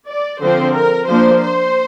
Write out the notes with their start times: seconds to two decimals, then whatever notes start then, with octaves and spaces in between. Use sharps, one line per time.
0.08 D5
0.41 D3 F3 C4 C5
0.75 A#4
1.08 F3 A#3 D4 C5
1.42 C5